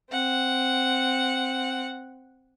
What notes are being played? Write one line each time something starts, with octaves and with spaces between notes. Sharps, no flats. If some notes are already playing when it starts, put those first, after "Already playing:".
C4 F#5